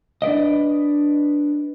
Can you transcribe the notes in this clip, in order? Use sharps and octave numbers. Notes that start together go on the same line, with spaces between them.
D4 B4 D5 D#5